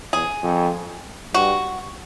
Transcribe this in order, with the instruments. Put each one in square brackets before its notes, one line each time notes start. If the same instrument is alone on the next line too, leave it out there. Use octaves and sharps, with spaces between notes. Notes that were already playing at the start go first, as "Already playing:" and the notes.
[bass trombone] E2 [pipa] G#4
[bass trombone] F2
[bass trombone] G2 [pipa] F#4